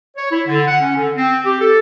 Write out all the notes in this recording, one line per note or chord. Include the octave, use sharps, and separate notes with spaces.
C#5
E4
D3
F#5
C#4
D3
C4
G4
A4